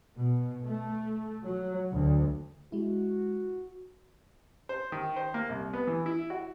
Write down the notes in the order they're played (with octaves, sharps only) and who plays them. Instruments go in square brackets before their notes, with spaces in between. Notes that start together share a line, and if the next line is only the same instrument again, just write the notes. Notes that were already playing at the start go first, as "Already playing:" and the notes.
[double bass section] B2
A3
F#3
D2
[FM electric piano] G#3 E4 [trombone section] F#4
[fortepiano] C5
D#3
C5
A#3
C2
B3
E3
E4
F#4